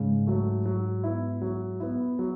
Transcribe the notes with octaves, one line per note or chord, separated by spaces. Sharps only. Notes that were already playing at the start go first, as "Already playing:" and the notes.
Already playing: G#2 C#3
F#3 A3
F#3
B3 E4
F#3
B3 E4
F#3